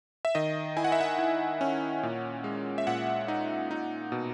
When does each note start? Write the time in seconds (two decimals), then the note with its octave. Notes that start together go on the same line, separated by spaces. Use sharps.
0.25 E5
0.35 D#3 D#5
0.77 E4 G#5
0.84 F#5
0.92 E5
1.01 F#5
1.18 E4
1.61 C#4
2.03 A#2
2.44 G#3
2.78 E5
2.87 A#2 F#5
3.28 D#4
3.71 D#4
4.12 B2